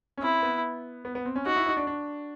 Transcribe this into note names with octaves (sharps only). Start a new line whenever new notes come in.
C#4
C4 E4
B3
B3
B3
C4
C#4
D#4 F#4
E4
D#4
D4
D4